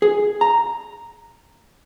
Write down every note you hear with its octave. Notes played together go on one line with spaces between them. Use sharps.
G#4
A#5